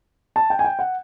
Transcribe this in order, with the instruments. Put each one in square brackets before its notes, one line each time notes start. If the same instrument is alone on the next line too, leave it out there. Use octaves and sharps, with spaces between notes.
[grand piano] A5
G5
G#5
G5
F#5